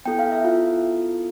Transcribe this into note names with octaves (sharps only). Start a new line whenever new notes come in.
B3 E4 A4 G5
F5
E5
F4 F5